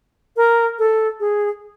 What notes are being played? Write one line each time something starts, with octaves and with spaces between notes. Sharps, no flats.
A#4
A4
G#4